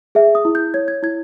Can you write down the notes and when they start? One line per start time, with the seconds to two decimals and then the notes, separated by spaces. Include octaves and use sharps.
0.15 G#4 E5
0.35 D#6
0.45 E4
0.55 G6
0.74 C#5 G#6
0.88 G#6
1.03 E4 G#6